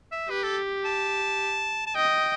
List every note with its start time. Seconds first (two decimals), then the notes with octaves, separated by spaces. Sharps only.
0.11 E5
0.30 G4 B4
0.43 A4
0.85 A5
1.86 A5
1.95 D#5 G5